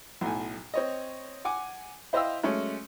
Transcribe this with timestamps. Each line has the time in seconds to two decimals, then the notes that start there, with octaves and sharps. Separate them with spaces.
0.21 B1 A2 G#5
0.74 C4 C#5 D#5
1.45 F#5 G#5 D6
2.13 E4 C5 D#5 F5 G5 E6
2.43 F#3 G#3 A3 C#4